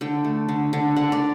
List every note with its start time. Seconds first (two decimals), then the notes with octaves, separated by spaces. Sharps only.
0.01 D3 G5
0.25 A3
0.49 D3
0.73 D3
0.96 D3 F#5
1.12 D5